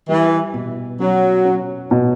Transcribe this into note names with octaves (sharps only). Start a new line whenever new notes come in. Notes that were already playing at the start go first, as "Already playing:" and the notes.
E3 G3
B2
F#3 C#4
C#4
B2